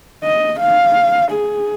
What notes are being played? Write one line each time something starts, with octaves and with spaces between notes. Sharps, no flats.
D#5
F5
G#4